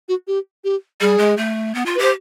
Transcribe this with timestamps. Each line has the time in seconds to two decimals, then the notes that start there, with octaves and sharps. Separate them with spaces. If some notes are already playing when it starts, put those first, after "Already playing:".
0.09 F#4
0.27 G4
0.64 G4
1.01 G3 G#4
1.18 G#3
1.37 A3
1.75 B3
1.86 F4
1.95 B4
1.99 G4 C5